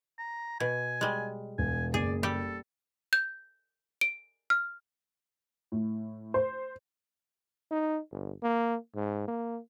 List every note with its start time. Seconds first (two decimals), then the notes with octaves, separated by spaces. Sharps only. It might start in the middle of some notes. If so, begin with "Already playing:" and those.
0.19 A#5
0.60 B2 G#5
1.01 G3 G#3
1.58 E1 G#5
1.94 F#1 G#4 D5
2.23 G3 G4 A4
3.13 G6
4.01 D7
4.50 F6
5.72 A2
6.34 C5
7.71 D#4
8.12 G1
8.43 A#3
8.95 G#2
9.28 A#3